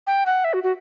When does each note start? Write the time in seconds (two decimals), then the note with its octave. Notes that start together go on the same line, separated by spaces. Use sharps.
0.07 G5
0.26 F#5
0.44 E5
0.54 F#4
0.64 F#4